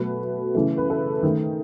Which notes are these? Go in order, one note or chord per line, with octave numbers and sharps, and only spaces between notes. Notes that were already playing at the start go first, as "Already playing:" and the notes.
Already playing: B2 F#3 A3 B4
C#3 E3 A3
B4
A4
D#3 A3